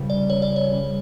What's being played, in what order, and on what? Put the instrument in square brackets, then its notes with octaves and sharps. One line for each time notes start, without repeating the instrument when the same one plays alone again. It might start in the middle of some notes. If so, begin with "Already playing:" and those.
Already playing: [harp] C#2 C#3 G3 C#4
[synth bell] D5
[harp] C#2 [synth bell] C#5
[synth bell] D5
C#5
[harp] C#3 G3 C#4